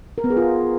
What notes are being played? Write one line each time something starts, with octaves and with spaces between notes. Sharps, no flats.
A#4
B3
G#4
F4